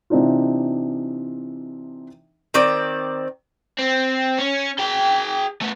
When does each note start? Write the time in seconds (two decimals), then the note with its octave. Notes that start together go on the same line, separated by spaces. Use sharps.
0.10 C3 E3 C4 D4 D#4 F4
2.54 D#3 C4 D5
3.78 C4
4.39 C#4
4.79 G#4 G5
5.61 A3 B3